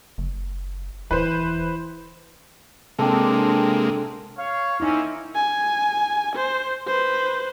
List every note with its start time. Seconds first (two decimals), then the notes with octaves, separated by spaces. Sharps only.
0.18 F#1
1.11 D#1 E3 B4 C5
2.99 C3 G#3 A#3 C4 D4 A4
4.36 C#5 F5
4.80 A#3 C4 C#4 D#4 E4
5.35 G#5
6.36 C5
6.87 B4 C5